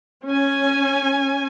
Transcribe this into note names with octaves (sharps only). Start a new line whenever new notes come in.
C#4 G#5